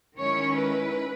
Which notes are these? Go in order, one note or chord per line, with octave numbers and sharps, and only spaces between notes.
D#3 G#3 C#4 E4 C#5
B4